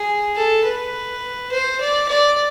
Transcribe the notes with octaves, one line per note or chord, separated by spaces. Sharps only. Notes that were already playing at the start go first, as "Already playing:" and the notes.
Already playing: G#4
A4
B4
C5
D5
D5